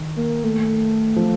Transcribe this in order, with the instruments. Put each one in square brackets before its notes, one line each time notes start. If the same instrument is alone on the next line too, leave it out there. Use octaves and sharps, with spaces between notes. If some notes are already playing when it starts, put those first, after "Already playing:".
Already playing: [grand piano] D#3
[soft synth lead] A#3
A3
[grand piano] F3